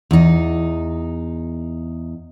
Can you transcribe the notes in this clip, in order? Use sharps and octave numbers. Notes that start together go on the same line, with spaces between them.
E2 D#4